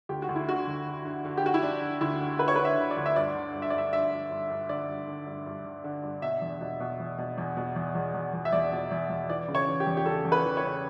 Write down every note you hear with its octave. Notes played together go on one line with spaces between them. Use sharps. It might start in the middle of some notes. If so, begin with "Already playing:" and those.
D2 G4
F#4
D2
E4
D3 F#4
D2
D3
D3
D3
G4
D3 F#4
E4
D3 D4
D3
D2 E4
D3
D3 B4
C#5
B4
D3
E5
D3
D5
D2
E5
G2 D5
D3
G2
E5
D5
G2 E5
G2 E5
G2
G2
G2
D3 D5
G2
D3
G2
G2
D3
D3
G2
B2 E5
E2
B2
B2
E2
B2
E2
B2
E2
E2
E2
E2
E5
E2 D5
B2
E2
E2
E3 D5
C#3
C#5
E3
G4
E2
G4
C#3 A4
E2
B4
E3
C#5
C#3